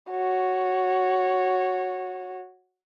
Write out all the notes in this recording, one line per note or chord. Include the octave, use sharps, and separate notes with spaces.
F#4 C#5